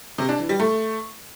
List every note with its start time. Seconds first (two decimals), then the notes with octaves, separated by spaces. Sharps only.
0.18 C3
0.29 D4
0.39 E3
0.49 G3
0.60 A3